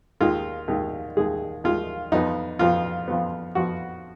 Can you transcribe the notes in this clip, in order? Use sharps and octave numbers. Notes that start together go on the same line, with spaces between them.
D#2 D#3 G#3 F4
D#2 D#3 G#3
D#2 D#3 G#3 G#4
D#2 D#3 G#3 F4
F2 F3 B3 D#4
F2 F3 B3 F4
F2 F3 B3
F2 F3 B3 F#4